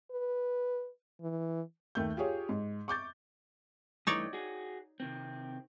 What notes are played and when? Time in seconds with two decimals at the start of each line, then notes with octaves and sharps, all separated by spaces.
0.11 B4
1.21 E3
1.95 D#2 A3 G6
2.17 F4 G4 G#4 C#5
2.49 G#2
2.88 C#6 D6 G6 A6
4.07 G2 E3 A3 D#4 C#5 D5
4.33 F#4 G#4
5.00 C3 D#3 C4